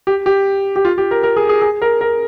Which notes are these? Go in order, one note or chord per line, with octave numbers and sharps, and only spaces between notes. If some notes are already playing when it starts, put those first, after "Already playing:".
G4
G4
G4
F4
G4
A#4
A#4
G#4
G#4
G#4
A#4
A#4